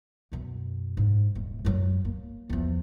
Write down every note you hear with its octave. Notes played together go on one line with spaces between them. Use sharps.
B1 F#2
G#2 D#4
D#1
F#2 F#3
A#3
E2 F3